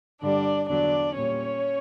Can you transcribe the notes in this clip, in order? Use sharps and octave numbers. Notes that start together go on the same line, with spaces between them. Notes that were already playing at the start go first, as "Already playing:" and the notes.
G2 D3 G3 D4 D5
E2 D3 F#3 D4 D5
A#2 G3 C#4 C#5